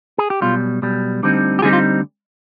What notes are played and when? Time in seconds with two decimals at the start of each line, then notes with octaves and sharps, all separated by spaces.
0.18 G#4
0.30 G4
0.42 B1 B2 G3 F4
0.82 B1 B2 G3
1.23 D2 D3 G3 C4 D#4
1.59 G4
1.62 D2 D3 G3 C4 D#4 F4 G#4
1.73 F4